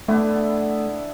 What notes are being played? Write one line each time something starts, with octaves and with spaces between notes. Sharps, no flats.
D3 A3 B3 E4